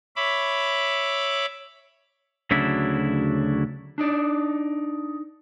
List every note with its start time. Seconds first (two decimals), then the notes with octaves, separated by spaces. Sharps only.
0.16 C#5 E5 B5 D6
2.51 D2 C#3 F#3 D4 E4 E5
3.98 D4 D#4 D5